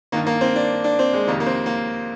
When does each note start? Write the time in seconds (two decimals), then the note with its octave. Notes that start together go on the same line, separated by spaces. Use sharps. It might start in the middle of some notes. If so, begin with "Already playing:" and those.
0.12 G2 D#3 A#3
0.27 A#3
0.41 C4
0.56 D4
0.84 D4
0.99 C4
1.13 G#3
1.27 F2 C3 D#3 A#3
1.40 A#3
1.46 C4
1.66 A#3